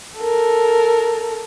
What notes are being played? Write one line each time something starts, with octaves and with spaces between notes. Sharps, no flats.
A4 A#4